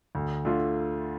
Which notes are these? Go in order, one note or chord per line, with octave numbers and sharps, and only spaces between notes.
D2
D3 A3 F4